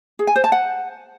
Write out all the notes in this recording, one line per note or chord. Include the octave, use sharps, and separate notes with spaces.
G#4
G#5
C5
A5
F#5